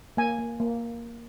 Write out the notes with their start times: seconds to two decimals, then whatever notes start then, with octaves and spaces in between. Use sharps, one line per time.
0.17 A#3 G#5
0.38 A#3
0.60 A#3